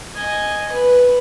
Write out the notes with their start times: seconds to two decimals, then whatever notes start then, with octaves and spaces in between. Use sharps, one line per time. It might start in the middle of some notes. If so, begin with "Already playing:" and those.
0.16 D#5 G#5
0.72 B4